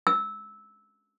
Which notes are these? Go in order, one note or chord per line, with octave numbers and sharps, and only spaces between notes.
E6